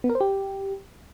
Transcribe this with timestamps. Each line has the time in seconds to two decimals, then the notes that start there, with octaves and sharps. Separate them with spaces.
0.04 B3
0.10 A#4
0.15 C5
0.21 G4